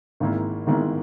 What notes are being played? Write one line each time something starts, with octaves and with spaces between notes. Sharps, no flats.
G#1 G#2 D#3 A#3 E4
G#1 G#2 D#3 A#3 E4